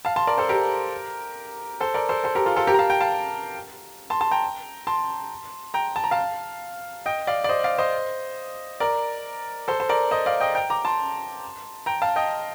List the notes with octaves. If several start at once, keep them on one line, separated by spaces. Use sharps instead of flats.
F5 A5
A5 C6
A#4 D5
A4 C5
G4 A#4
A4 C5
A#4 D5
A4 C5
A4 C5
G4 A#4
F4 A4
F4 A4
G4 A#4
A#5
F5 A5
G5 A#5
F5 A5
A5 C6
A5 C6
G5 A#5
A5 C6
G5 A#5
A5
A#5
F5 A5
D#5 G5
D5 F5
D5
C5 D#5
D5 F5
C5 D#5
A#4 D5
A4 C5
C5
A#4 D5
C5 D#5
D5 F5
D#5 G5
G5 A#5
A#5 D6
A5 C6
G5 A#5
F5 A5
D#5 G5